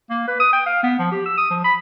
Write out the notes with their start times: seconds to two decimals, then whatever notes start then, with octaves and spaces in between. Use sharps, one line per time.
0.10 A#3
0.28 B4
0.40 D#6
0.53 G5
0.66 F5
0.83 B3
0.99 F3
1.12 G4
1.25 E6
1.37 D#6
1.50 F3
1.64 B5